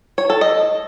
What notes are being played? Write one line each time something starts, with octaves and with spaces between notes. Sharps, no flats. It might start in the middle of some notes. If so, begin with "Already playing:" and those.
C#5
A4
D#5